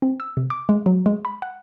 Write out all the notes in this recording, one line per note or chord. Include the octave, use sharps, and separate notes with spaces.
C4
E6
C3
D6
G#3
F#3
G#3
B5
F#5